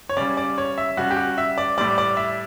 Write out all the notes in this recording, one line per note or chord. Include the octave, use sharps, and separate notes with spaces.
C#5
C#3 G3 D5
D5
C#5
E5
C#3 G3 F#4
G4
F#4
E5
D5
A2 G3 D5
D5
E5